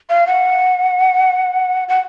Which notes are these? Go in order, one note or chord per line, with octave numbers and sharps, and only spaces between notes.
F5
F#5
F#5